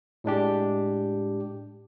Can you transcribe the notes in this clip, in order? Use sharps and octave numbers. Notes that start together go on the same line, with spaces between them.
A2 G#3 D4 G4